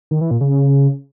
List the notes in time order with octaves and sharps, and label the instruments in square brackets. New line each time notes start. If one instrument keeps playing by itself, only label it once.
[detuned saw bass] D#3
E3
A#2
C#3